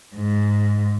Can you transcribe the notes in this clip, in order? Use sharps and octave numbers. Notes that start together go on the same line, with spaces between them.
G#2